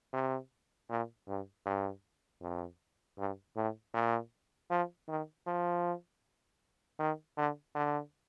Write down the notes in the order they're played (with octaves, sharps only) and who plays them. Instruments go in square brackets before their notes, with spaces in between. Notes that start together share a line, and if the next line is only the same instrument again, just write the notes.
[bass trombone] C3
A#2
G2
G2
F2
G2
A2
A#2
F3
D#3
F3
D#3
D3
D3